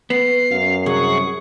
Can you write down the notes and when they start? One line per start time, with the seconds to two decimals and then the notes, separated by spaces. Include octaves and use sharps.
0.10 B3 C7
0.51 F#2 F5
0.86 C2 G#4 F#5 C#6